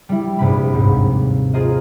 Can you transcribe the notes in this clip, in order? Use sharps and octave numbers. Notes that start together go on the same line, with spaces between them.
G3 E4
A#1 G2 C3 G3 B5
D#2 G#2
F4 G#4 A#4 C5 D#5